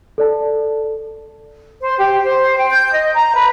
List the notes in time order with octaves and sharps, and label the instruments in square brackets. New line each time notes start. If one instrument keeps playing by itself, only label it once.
[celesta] A4 D5 A5
[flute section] C5
G4
C5
G5
G6
D#5
A#5
B4